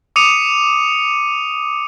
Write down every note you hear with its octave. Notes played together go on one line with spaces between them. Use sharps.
D6 D#6 C#7 D#7 F7